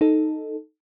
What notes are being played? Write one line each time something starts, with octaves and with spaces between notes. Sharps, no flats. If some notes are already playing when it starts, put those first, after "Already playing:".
D#4 A4